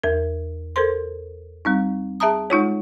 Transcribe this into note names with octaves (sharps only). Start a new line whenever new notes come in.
E2 A#4
A4 A#4 C5 C6
G3 C4 D#4
G#4 E5 A5 A#5 D#6
G#3 D#4 F4 C#5